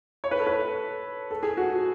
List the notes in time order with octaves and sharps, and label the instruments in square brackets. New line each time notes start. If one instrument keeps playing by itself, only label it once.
[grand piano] C#5
B4
A4
B4
A4
G#4
F#4